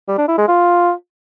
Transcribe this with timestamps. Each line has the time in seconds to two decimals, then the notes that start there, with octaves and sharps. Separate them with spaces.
0.08 G3
0.18 D4
0.28 E4
0.38 G#3
0.48 F4